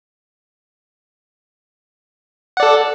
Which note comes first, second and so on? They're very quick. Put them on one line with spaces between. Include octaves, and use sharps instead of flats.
F#5 D5 A4